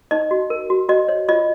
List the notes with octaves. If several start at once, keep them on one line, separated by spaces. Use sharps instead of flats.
D#4 D#5
F#4
A#4
F#4
F#4 D#5
C#5
F4 D#5